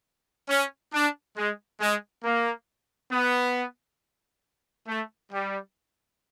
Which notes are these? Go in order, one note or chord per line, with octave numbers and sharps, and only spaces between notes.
C#4
D4
G#3
G#3
A#3
B3
A3
G3